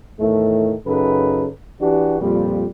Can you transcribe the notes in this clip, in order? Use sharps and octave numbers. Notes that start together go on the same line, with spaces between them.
E2 A2 D#3 A3
F#2 C#3 D#4 A4 B4
E3 D4 F#4 G4
F2 A#2 G3